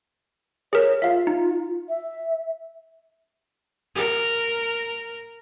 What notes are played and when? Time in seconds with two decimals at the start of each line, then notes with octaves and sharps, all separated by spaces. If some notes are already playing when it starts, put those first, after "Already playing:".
0.73 G#4 A#4 C#5
1.02 F4 E5 F5
1.27 D#4
1.89 E5
3.95 A#4